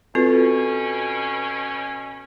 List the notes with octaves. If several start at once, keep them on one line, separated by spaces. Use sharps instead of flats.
B2 C4 C#4 F4 F#4 A4 B4